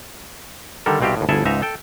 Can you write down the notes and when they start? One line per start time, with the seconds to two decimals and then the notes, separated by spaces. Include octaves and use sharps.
0.86 D3 D#3 G3 A4 A#4
1.01 C2 B2 C4 F4 G4
1.17 D#2 A2
1.29 G1 D2 E4 G#4 A4 E5
1.45 C#2 G#2 D#4 E5 A#5
1.62 A4 G5